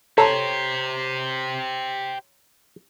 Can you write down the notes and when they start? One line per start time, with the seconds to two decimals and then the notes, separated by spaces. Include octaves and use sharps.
0.18 G4 A4 C5 C#5 A#5 C6